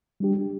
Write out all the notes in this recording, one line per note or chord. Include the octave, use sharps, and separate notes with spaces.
G3 D4 G4